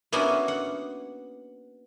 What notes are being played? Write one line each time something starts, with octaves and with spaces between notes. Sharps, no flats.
A#3 B3 C#4 D4 E4 F#4
F#5